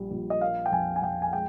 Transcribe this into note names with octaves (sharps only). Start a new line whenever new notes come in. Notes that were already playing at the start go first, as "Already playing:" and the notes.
Already playing: A#1 G3
A#1
D#5
A#3 F5
G5
F2 G#5
G#5
F2 G5
G#5
G#3 G5